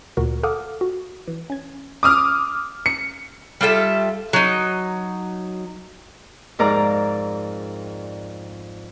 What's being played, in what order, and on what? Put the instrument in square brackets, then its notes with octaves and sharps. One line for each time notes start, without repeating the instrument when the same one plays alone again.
[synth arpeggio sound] D2 A#2 F#4 A#4
A4 F5 F#5 D6 D#6 F6
F#4
E3
C#4 G#6
[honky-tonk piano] D6 D#6 F6
C#7
[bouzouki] G3 F4 A4 E5
F#3 D#4
[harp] F2 G#2 A#4 D5 A#5